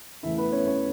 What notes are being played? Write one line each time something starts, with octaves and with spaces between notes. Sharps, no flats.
E2 C#3 E3 A3 E4 E5
B3 B4
C#4 C#5
C#4 C#5